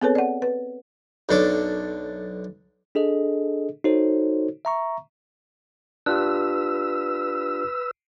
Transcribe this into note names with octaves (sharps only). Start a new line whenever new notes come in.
B3 C4 G#4 A4 B4 C#5
D5 F#5
B4
B1 F#2 D4 A4 C#5 D6
D4 G#4 A4 D#5
D#4 F#4 A4 C5 C#5
E5 A#5 C#6
D4 F4 G4 B4 E6